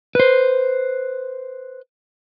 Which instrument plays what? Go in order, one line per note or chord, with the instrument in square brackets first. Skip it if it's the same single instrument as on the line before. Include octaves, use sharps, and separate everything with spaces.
[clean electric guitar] B4 C5